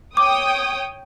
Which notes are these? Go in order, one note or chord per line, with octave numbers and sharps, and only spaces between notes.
C#5 G5 D6 D#6